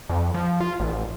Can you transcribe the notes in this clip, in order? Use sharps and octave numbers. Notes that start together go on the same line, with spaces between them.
F2
F3
F4
A1